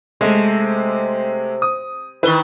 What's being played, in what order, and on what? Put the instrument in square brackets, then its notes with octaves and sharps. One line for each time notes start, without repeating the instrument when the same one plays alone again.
[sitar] C3 [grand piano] G#3 A3
[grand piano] D#6
[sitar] D#3 E4 [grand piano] B4 G7